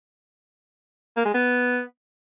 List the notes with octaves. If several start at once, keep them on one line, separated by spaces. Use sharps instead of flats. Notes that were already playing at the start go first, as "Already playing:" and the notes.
A#3
G#3
B3